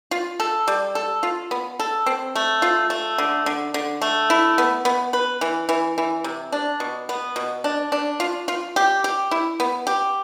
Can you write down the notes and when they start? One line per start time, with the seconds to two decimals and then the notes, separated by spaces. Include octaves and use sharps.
0.11 F4
0.40 A4
0.68 G3
0.95 A4
1.23 F4
1.51 B3
1.79 A4
2.06 C4
2.35 A3
2.62 F4
2.90 A3
3.18 D3
3.46 D3
3.74 D3
4.01 A3
4.30 E4
4.58 B3
4.85 B3
5.13 B4
5.41 E3
5.69 E3
5.98 E3
6.24 C3
6.52 D4
6.80 B2
7.09 B3
7.36 B2
7.64 D4
7.92 D4
8.20 F4
8.48 F4
8.76 G4
9.04 G4
9.31 E4
9.60 B3
9.87 G4